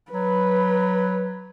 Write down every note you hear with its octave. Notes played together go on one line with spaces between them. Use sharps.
F#3 B4